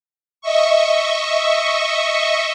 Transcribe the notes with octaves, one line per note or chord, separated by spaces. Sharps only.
D#5 E5 C#6